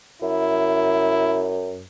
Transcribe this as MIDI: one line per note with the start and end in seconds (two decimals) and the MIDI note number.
0.22 1.86 42
0.22 1.53 64